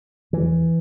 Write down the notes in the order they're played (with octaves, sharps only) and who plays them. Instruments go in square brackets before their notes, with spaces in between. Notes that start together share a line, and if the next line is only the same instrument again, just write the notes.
[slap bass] E2 E3